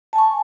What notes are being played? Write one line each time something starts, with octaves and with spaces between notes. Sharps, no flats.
G#5 A5 C#6